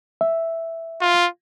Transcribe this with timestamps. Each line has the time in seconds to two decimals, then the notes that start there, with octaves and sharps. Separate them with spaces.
0.21 E5
1.01 F4